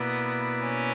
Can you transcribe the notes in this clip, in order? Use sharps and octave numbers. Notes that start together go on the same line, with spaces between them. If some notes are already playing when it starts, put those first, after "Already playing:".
Already playing: B2 A#3 B3 E4 B4 D5
C#4